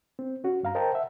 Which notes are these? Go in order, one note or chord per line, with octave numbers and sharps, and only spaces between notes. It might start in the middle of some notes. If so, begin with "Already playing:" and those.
C4
C#4 F#4
G2 F5 A#5
A#4 C5 D#5 G5 A5 A#5
E5 F#5